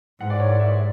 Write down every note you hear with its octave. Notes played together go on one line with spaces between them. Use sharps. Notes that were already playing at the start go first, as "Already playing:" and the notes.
G#2 F#5
D5
C#5
D5
E5
D5